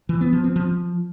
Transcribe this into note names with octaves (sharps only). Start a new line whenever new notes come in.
E3
B3
F3
C4
F3